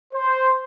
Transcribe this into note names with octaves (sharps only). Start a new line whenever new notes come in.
C5